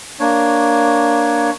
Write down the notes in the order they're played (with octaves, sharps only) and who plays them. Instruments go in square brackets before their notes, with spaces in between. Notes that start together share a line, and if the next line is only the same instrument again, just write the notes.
[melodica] A#3 D4 C#5